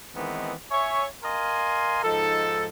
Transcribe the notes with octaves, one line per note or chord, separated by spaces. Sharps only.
D#3 E3 G#3 B3 C4 D#4
C#5 E5 G#5
A#4 D#5 F5 G#5 C6
G#2 F3 D#4 A4